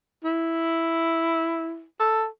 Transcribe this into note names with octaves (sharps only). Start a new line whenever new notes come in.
E4
A4